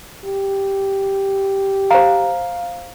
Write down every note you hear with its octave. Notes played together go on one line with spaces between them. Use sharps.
G4
C5 F5 A#5